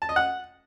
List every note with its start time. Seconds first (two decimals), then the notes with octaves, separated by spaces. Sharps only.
0.02 A5
0.09 D#5
0.16 F#5